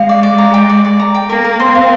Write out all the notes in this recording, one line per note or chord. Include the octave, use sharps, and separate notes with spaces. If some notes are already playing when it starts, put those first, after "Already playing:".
Already playing: G#3 F5
D5
D5
A#5
G5
D5
D5
A#5
G5
A#3 A#4
A#4
C4 C6
F5